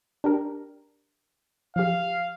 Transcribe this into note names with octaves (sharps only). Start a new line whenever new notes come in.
D4 G4 A#4
F3 G4 F5